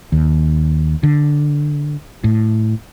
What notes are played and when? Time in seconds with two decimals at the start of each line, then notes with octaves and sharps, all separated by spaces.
0.12 D#2
1.03 D3
2.24 A2